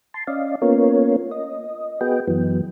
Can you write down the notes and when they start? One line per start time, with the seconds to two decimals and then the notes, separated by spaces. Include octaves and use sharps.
0.14 A5 C6
0.27 C#4 D5 D#5 F5
0.62 A#3 B3 C#4 F4 A#4 C#5
1.31 D#5
2.01 B3 F#4 G#4 B4 D#5 G5
2.28 F#2 E3 F#3 B3